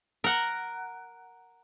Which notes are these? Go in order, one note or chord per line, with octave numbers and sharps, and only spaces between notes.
A#4 F#5